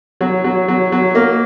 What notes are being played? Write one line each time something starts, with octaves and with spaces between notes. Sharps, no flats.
F#3
F#3
F#3
F#3
A#3